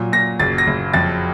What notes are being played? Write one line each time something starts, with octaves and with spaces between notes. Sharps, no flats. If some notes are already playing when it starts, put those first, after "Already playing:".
Already playing: A#2 F#3
A#2 A#6
F#1 A6
A#6
F#1
F2 A6